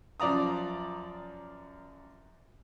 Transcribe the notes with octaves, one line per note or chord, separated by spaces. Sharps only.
F#2 F3 D5 A#5 D#6